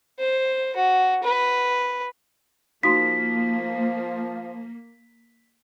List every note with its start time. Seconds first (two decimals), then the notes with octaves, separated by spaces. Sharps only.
0.19 C5
0.76 F#4
1.23 B4
2.83 F3 A#3 D#4 F#4 C6 B6